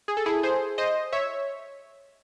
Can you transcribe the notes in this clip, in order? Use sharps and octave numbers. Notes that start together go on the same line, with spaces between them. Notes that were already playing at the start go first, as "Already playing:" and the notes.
G#4
A4
E4 G#4
G#4 C5
C5 D#5
C#5 E5